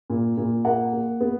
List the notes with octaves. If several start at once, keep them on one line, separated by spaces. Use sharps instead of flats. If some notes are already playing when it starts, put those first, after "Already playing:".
A#2
A#2
A#3 F#5
A#3
B3